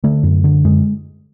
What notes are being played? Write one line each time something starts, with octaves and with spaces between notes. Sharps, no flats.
D3 A3
F#2
D3
F#2 G#3